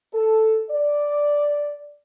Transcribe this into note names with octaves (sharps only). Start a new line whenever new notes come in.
A4
D5